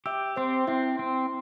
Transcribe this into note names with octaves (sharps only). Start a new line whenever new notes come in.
G4 E5 E6
C4 C5 C6
C4 E4 E5
C4